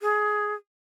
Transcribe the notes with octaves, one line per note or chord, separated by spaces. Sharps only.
G#4